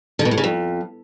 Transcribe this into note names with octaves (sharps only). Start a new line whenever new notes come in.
D3
B2
A2
C#3
F2